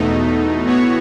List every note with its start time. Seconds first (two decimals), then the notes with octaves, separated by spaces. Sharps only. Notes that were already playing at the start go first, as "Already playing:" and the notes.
Already playing: E2 B2 A3 D#4
0.65 A2 E3 B3 F#4 C#5